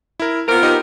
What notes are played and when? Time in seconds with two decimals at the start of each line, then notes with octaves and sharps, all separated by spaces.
0.20 E4 A#4
0.49 B3 C4 F4 A#4 D7
0.63 D#4 G4 D#5